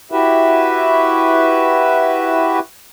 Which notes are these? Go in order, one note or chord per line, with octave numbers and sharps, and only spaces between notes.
E4 F#4 G4 B4 E5